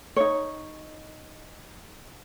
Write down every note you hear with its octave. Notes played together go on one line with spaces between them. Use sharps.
D#4 C#5